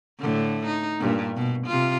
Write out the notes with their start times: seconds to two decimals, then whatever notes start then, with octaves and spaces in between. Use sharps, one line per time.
0.19 A2 D3
0.66 D#4
1.00 G2 A#2
1.36 B2
1.67 C3 F4